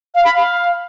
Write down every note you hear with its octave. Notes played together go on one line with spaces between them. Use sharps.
F5
B5
F5